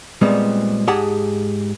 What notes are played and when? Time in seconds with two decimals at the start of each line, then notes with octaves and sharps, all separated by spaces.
0.21 A#2 G3 G#3 B3 C4
0.87 G#2 G4 G#4 F#5 A5